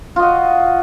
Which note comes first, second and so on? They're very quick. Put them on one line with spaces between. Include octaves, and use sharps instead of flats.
F4 D#5 F#4